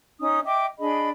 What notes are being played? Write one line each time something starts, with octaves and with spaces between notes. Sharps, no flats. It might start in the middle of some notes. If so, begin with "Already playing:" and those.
C#4 D#4 D#6
D#5 E5 G5 D6
D4 G#4 D#5 B5